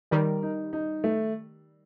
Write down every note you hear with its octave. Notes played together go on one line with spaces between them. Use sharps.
D#3 G3 A#4
D#4
D#4
A3